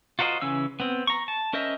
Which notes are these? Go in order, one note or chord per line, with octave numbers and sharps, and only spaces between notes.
F4 F#4 A#4 C5 D#5
C#3 E3 C#4 E6
B3 C4
A#5 C#6
A5
C#4 A#4 C5 D#5 E5